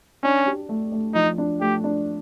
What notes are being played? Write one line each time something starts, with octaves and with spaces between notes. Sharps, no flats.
C#4 D4
G4
A3
A3
F3 D#4
D4
A3 G4
D4